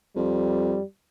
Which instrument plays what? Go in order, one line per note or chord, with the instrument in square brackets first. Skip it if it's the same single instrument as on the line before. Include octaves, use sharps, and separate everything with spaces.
[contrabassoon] F2 [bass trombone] G3